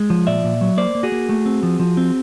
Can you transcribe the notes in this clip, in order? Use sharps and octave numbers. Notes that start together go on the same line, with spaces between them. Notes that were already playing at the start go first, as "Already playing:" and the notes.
Already playing: G#3
F3
A#2 D5 E5
A#2
F#3
A#3 C5 D5
A#3
F#4 G#4
A#3
A3
C4
F3
F3
C4